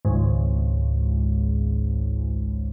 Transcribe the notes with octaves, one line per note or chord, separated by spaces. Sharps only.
G#1 C#2 G#2